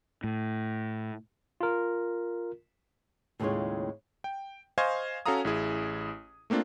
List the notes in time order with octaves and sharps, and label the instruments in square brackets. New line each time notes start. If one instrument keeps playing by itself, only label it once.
[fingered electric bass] A2
[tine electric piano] F4 A#4
[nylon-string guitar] D#2 A2 C#3 G#3 F4 C#5
[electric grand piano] G5
C5 D#5 F5 G#5 C#6 G#6
C#4 F#4 A4 F5 A#5 D#6
A1 E4 G#4
A3 A#3 C4 D4 F4